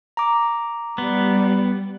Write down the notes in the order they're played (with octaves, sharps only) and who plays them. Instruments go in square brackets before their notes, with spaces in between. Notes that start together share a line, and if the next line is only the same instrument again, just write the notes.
[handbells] A#5 D6
[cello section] G3 [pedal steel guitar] B3